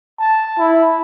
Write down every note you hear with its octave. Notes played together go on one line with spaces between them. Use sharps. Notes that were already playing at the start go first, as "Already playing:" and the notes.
A5
E4